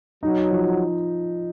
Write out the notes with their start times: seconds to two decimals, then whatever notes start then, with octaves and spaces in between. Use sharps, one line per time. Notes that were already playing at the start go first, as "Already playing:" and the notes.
0.23 F#3 D#4
0.51 F3